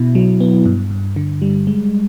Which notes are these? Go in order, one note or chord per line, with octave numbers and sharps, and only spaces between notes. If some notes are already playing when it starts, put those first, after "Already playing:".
Already playing: B2 E4
F#3
B3
G2
G2
D3
G3
G#3